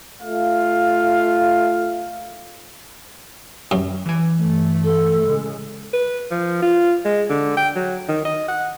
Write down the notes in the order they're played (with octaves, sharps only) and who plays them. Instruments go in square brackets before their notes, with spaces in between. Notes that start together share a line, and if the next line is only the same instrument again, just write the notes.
[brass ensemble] A3 F4 F5
[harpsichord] F#2
[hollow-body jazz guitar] E3 G#5
[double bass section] G2 A3
[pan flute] A4
[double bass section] A2 C#3 G#3
[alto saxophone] B4
F3
F4
G#3
D3
G5
F#3
D#3
D#5
F#5